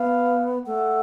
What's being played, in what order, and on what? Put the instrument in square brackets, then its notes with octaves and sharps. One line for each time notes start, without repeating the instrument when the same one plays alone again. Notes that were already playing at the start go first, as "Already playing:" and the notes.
Already playing: [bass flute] B3 [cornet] F5
[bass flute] A3 [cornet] F#5